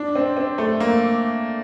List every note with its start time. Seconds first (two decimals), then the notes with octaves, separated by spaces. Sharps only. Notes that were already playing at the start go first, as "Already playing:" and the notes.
Already playing: D4
0.15 C4
0.37 C4
0.58 A3
0.80 A#3